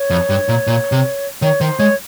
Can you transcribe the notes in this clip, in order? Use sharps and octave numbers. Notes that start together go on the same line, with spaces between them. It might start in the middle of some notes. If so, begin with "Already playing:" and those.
Already playing: C#5
F2
G2
A#2
A#2
C3
D#3 C#5
D#3 C5
G#3 C#5